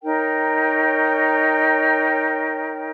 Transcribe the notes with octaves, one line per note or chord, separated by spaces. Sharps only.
D#4 A#4 C#5 G5